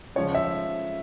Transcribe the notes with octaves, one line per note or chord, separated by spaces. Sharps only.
C#3 F3 G#3 C#5
E5